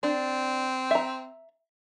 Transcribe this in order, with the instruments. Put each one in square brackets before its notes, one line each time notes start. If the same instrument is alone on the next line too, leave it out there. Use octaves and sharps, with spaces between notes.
[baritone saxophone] C4 [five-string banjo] D4
[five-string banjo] E5 A#5